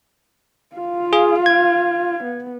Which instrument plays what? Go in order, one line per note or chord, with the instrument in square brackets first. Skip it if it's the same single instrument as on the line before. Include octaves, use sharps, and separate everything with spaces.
[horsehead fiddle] F4 F5
[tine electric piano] G#4
G#6
[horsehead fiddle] B3